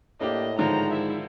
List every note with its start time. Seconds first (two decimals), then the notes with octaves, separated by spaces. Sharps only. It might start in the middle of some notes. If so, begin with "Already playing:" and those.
0.21 A2 A#3 D4 G4 D#5
0.59 G#2 D3 D#3 F3 A#5
0.91 E4 E5